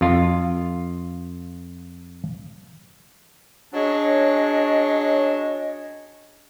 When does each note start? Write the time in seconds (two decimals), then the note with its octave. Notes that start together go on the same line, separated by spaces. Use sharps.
0.01 F2 F4
3.74 F#3 C#4 D4 G#4 C#5 D#5